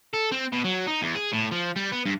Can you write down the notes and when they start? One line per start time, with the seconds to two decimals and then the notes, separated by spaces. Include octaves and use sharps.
0.13 A4
0.32 C4
0.53 B2
0.65 F#3
0.87 D#4
1.03 E2
1.15 G#4
1.33 A2
1.51 F3
1.76 G3
1.92 B3
2.06 G2